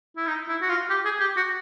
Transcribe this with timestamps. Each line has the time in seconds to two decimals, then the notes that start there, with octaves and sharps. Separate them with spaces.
0.17 E4
0.27 D#4
0.49 E4
0.62 F#4
0.69 F4
0.90 G4
1.05 G#4
1.20 G4
1.36 F#4